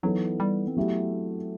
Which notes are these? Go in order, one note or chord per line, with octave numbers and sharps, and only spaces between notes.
E3 F#3 B3 D#4 A4
G3
C4
F#3 A3 B3 E4 G4
C4